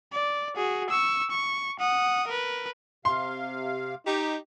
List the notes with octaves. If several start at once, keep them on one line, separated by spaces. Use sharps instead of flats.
D5
F#4 G#4
C#6 E6
C#6
F#5 D#6
A#4 B4
C3 F5 C6
D#4 G4